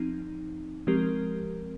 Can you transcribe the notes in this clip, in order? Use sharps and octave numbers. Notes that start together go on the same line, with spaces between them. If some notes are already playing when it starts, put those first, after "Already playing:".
Already playing: F3 C4 D#4
F3 G#3 C4 G4 A#4